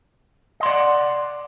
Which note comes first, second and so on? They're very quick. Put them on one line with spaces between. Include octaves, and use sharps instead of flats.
D#5 C6 D5 F#5